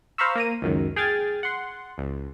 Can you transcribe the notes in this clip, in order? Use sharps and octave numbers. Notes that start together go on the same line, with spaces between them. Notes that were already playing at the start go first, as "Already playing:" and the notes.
C5 F5 A#5 B5 C#6 E6
A#3 A#5 D#7
C#2 F#2 D#3
G#4 G5 F6 G#6 A6
F#5 C6
C#2